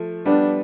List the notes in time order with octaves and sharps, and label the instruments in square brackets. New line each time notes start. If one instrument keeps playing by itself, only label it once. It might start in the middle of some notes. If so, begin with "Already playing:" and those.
Already playing: [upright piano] F3 A3
[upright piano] G3 B3 [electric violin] D4